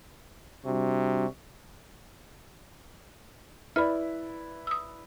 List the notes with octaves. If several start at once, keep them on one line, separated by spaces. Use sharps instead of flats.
C3 G3 D4 F#4
E4 B4 D5 B5 F6
D#6 E6